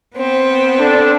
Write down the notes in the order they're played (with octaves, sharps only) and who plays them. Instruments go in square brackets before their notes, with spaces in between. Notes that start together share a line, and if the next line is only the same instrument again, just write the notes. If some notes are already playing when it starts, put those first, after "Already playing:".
[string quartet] B3 C4
[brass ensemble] D4 A4